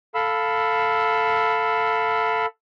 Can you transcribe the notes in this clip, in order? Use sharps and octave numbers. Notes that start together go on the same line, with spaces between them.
A4 F5 B5 E6